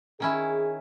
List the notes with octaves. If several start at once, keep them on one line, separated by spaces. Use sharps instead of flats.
D#3 C#4 E4 G#4